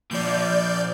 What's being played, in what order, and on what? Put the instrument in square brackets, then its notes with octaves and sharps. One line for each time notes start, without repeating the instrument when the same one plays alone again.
[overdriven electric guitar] A#2 F3 [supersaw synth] D5 G6